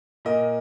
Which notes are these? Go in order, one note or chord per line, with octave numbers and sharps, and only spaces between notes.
A#2 A#4 D#5